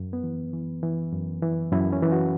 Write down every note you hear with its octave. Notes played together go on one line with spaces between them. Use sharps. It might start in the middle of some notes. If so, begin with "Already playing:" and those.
Already playing: F#2
B3
E3
E3
E3
F#2
E3
F#2 E4
C#4
E3
F#4